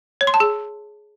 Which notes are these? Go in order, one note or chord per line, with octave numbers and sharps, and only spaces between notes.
C#5
C6
A5
G#4